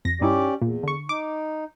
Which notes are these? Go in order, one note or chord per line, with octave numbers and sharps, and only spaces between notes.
F2 A#6
G2 C#4 D#4 E4 G4 D5
E2 A#2
D3 C#6
D#4 D6